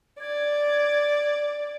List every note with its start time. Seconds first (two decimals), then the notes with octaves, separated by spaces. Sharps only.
0.21 D5 G#6